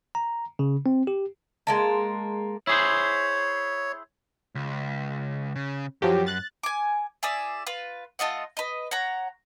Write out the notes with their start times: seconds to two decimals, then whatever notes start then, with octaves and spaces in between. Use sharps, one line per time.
0.15 A#5
0.59 C#3
0.86 C4
1.07 G4
1.67 G#3 A#3 A5
2.67 E4 G#4 C5 C#5
4.55 C#2
5.56 C#3
6.02 F#2 F3 F#3 G4
6.27 F#6 A6
6.63 G#5 D6
7.23 E4 G#4 D5 E5
7.67 F4 B4
8.19 A3 F4 D#5 F#5
8.57 B4 D#5
8.91 C#5 F#5 A#5